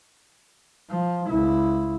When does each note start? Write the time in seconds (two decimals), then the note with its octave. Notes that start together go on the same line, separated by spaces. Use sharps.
0.90 F3
1.30 C#2 E4